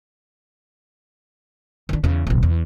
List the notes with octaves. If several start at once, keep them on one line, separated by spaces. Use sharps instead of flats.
D#3 D4
E2 C#3
D1 B1
E2